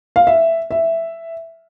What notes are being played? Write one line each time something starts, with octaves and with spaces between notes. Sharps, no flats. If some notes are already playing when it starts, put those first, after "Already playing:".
F5
E5
E5